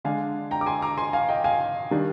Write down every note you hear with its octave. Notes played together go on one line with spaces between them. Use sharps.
D3 G#3 D4 F5 G#5
G5 A#5
D6
G#5 C6
A#5 D6
G#5 C6
F5 G#5
D#5 G5
F5 G#5
D#3 G3 D4